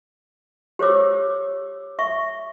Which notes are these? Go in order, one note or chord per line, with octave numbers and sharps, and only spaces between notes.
G4 C5 C#5 D6 E6
E5 C#6